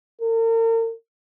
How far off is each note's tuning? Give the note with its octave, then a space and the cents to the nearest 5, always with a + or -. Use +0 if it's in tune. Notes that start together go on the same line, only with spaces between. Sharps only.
A#4 -40